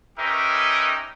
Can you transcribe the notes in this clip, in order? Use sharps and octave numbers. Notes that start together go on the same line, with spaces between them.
C#4 D#4 G4 A#4 B4 E5